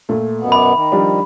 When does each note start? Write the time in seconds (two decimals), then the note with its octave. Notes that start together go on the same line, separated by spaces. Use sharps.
0.09 A#2 A3
0.40 F#2 B2 B3
0.52 E5 B5 D6
0.74 D#3
0.92 F3 G3 D4